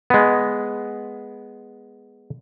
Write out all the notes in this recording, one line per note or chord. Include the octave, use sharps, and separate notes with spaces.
G#3 B3